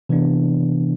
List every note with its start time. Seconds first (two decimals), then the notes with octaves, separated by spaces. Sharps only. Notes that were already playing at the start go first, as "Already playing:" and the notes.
0.09 C3 E3 B3 D4